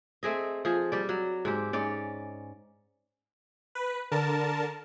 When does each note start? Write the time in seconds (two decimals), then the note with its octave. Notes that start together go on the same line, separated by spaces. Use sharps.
0.23 A3 C4 G#4 D#5
0.65 F3 G#4
0.92 G3 D5
1.09 F#3
1.45 G#2 C4 G4
1.73 G#2 C#4 D5
3.75 B4
4.12 D3 A#4 A5